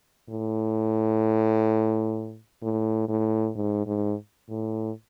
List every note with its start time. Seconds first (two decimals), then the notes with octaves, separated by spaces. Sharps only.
0.29 A2
2.63 A2
3.08 A2
3.55 G#2
3.87 G#2
4.49 A2